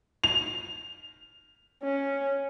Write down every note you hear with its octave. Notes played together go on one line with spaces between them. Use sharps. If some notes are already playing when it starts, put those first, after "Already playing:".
F7
C#4